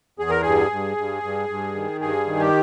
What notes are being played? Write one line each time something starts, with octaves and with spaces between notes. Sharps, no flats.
E2 G#4
A#4
G2 G#4
G2
G2
G2
G2
D#3
G2 G#4
D#3
G4